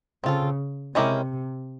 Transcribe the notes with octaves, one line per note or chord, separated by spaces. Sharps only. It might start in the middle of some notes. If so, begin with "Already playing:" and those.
C#3 C4 F4 A4
C3 G#3 C#4 E4 G4 A#4